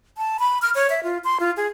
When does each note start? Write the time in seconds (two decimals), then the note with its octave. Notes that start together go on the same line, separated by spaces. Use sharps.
0.17 A5
0.39 B5
0.62 F6
0.75 C#5
0.90 E5
1.03 F4
1.24 C6
1.40 F4
1.57 G#4